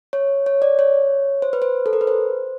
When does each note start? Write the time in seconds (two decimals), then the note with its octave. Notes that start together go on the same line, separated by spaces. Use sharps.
0.13 C#5
0.46 C#5
0.62 D5
0.79 C#5
1.42 C5
1.53 B4
1.62 C5
1.86 A4
1.93 A#4
2.01 B4
2.07 C5